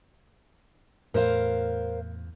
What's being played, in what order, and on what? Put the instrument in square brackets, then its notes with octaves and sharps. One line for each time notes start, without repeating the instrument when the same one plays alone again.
[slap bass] E2 [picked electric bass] A2 [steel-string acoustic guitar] A#4 C5 F5